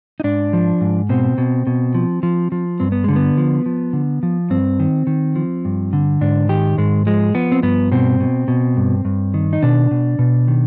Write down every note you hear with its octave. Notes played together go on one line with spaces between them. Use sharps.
D#4
G#2 D4
F3
G#2
B2 C4
B2
B2
F3
F3
F3
G2 C4
B3
D3 G#3
B3
F3
F3
D3
F3
G2 C4
D#3
D#3
F3
G2
D3
G#2 D4
D#3 G4
G#2 G#3
F3 G#3
F3 B3
C4
G2 B3
B2 C4
B2
B2
G2
G2
D#3
D#4
B2 D4
B2
B2
D#3